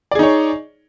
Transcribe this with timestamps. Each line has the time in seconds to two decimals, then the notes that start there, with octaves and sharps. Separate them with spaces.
0.11 D5
0.15 G#4
0.19 D#4
0.23 C#5